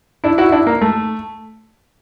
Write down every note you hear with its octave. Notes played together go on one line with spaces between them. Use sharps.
D4 E4
E4 F#4
D4 E4
A#3
A3